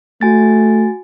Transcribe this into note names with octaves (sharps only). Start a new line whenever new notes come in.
A3 F#4 G#5 A6